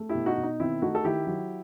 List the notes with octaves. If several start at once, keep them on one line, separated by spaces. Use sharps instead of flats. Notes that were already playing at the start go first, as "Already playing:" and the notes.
Already playing: A3
E4 G4
B2
D#4 F#4
B2
D#4
D#3 C4 E4
A3 D#4 F#4
A4
D#3 E4 G4
F#3